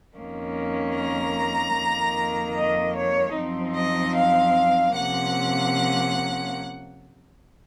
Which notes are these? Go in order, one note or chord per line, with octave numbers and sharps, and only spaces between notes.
F2 D#3 A#3 C#4
A#5
F2 D#3 A#3
D#5
C#5
F#2 F3 C4 D#4
D#5
F5
C3 F3 A#3 C#4 F#5